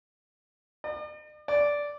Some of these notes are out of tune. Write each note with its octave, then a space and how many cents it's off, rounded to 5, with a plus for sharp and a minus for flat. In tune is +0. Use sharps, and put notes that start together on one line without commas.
D5 +45
D5 -10